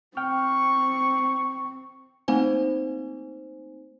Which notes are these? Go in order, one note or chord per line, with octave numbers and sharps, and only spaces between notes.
C4 G5 C#6 F6
A3 A#3 C4 D#4 C5 G#5